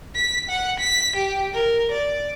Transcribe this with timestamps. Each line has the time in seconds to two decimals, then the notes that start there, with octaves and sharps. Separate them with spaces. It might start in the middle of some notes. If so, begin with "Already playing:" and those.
0.15 B6
0.49 F#5
0.80 B6
1.16 G4
1.54 A#4
1.91 D5